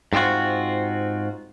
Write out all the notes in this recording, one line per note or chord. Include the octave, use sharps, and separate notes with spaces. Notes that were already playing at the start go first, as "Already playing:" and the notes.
G#2 C4 D4 F4 F#4